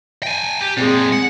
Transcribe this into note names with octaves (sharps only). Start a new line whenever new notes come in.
G5 G#5
G4
A#2 G#3 C4 G#4
F#5